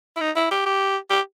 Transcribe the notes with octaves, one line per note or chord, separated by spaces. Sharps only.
E4
D#4
E4
G4
G4
G4